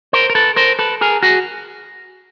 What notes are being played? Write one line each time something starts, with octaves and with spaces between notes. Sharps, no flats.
A#4 C5
A#4
A4 B4
A#4 C5
A4 B4
G#4 A#4
F#4 G#4